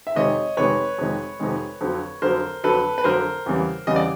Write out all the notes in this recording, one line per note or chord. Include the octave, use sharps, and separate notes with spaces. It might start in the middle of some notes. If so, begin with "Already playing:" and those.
E5
F2 C3 D#3 G#3 C#5 D#5
F2 C3 D#3 G#3 B4 C#5
F2 C3 D#3 G#3
F2 C3 D#3 G#3
F2 D3 F#3
F2 D3 F#3 A#4 C5
F2 D3 F#3 A4 B4
B4
F2 D3 F#3 A#4 C5
E2 C#3 E3 G3
E2 C#3 E3 G3 D#5
D5